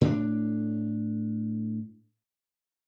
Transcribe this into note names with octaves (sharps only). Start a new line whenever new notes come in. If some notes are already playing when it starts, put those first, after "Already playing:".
A2 C4 D4